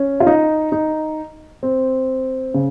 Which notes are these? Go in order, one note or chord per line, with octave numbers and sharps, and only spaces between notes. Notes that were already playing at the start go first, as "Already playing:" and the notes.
Already playing: C#4
F4
D#4
D#4
C4
C#3